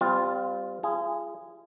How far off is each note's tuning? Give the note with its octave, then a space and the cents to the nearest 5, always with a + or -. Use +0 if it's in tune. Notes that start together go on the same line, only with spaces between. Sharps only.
G3 +0 C4 -30 F4 +0
F4 -40 G#4 -10